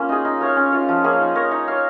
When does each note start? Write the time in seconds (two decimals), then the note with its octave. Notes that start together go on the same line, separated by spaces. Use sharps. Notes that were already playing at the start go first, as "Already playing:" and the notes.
Already playing: A#3 C#4 F4
0.09 D#4 G#4
0.25 D#4
0.41 A#4 C#5 F5
0.57 C#4
0.72 F4 C#5
0.89 F3
1.04 A#3 C#4 G#4
1.20 D#4
1.35 A#4 C#5
1.51 D#4
1.68 C#5 F5